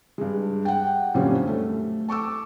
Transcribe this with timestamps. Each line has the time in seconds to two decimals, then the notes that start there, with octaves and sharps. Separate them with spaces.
0.18 G2 G#3
0.65 F#5 G5
1.15 F#2 A#2 D3 G3 C4 C#4
1.47 A3
2.08 A5 C#6 D6 E6